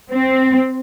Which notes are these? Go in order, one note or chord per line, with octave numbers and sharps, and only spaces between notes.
C4